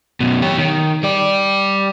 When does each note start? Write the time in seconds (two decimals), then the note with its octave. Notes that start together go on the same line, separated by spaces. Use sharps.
0.20 F#2 B2
0.42 G4 C#5
0.58 D#3
1.03 G3 D5